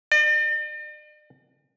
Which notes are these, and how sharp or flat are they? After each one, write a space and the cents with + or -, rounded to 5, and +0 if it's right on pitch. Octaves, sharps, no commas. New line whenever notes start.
D5 +45